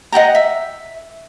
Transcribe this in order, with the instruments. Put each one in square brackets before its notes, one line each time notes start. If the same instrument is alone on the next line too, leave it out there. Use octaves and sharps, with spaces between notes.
[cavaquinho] D#5 F#5 G5 A#5
E5